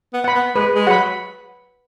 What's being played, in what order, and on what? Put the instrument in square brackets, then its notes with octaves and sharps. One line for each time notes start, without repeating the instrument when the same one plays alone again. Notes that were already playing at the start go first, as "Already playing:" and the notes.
[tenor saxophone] B3
[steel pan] F#5 B5
[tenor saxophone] B3
[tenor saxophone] G#3 [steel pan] B4
[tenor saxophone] G#3
[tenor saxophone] F#3 [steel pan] F#5 B5